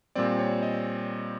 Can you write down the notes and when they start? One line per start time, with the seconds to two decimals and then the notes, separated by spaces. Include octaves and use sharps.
0.15 A#2 G3 C4 D5
0.39 C#5
0.63 D#5